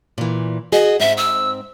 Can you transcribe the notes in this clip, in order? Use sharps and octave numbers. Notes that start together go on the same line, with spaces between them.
A#2 E3
F#4 G#4 D#5
G#2 C4 E5
E6